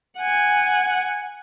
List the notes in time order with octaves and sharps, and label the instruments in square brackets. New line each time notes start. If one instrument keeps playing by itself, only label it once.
[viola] F#5 G#5